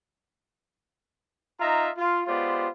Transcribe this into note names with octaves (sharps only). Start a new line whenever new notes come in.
D#4 F4 D#5 E5 A#5
F4
G#3 B3 F4 G4 C5 D5